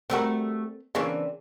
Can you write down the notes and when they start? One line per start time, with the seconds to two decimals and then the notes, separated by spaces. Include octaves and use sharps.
0.10 G3 A3 C4 F#4 A#4
0.95 C#3 E3 A#3 C4 D4